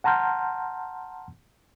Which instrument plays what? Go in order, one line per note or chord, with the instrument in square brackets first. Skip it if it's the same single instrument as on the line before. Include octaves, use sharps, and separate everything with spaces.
[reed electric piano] F#5 A5 A#5 C6 F6 G6